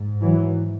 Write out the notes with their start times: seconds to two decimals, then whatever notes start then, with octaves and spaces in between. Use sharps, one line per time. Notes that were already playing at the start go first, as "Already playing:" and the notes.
Already playing: G#2
0.22 E3 F#3